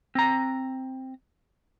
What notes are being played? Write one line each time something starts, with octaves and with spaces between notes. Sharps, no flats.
C4 A#5